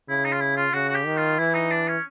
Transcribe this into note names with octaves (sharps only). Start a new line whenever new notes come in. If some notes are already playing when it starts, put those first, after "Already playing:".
C#3 E4
D#4
F4
E4
F4
C#3 F#4
F#4
G4
D#3
F4
E3 E4
D#4
D4
C#4